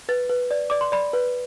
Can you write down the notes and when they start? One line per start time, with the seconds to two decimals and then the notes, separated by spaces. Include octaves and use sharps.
0.09 B4 A6
0.29 B4
0.51 D5
0.70 D5 D6
0.81 C6
0.92 D5 B5
1.13 B4